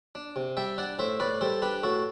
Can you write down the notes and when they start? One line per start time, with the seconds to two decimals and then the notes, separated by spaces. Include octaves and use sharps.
0.15 D4
0.36 C3
0.57 G3 E5 G5
0.78 D4 D5 F#5
0.99 A2 C5 E5
1.20 A2 B4 D5
1.41 G3 A4 C5
1.62 D4 G4 B4
1.83 A2 F#4 A4